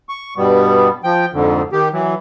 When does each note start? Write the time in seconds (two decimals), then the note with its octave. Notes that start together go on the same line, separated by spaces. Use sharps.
0.09 C#6
0.37 G2 B2 G3 B3
1.04 F3 G5
1.33 F2 G#2 D3
1.72 D#3 G4
1.93 E3 F#3